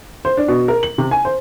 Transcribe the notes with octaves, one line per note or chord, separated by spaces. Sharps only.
C5
D4
B2
A#4
F#7
C3
G#5
C5